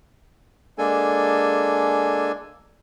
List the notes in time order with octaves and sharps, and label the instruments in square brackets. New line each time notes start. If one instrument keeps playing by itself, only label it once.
[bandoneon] G#3 A#3 D4 A4 G#5